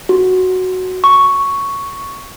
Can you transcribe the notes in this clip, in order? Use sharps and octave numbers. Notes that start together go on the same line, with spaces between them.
F#4
C#6